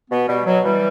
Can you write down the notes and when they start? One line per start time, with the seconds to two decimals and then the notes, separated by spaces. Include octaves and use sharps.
0.11 B2 B3
0.28 B2 G3
0.46 B2 F#3
0.64 E3 G3